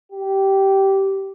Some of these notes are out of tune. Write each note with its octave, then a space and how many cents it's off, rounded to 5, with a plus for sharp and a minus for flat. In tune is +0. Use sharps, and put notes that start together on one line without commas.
G4 -15